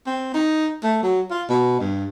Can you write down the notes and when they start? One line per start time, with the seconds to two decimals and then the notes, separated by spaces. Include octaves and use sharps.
0.06 C4
0.34 D#4
0.83 A3
1.03 F#3
1.31 F4
1.49 B2
1.80 G2